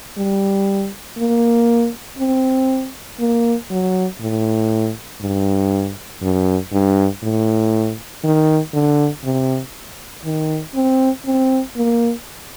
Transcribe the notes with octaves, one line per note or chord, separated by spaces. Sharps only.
G3
A#3
C4
A#3
F#3
A2
G2
F#2
G2
A2
D#3
D3
C3
D#3
C4
C4
A#3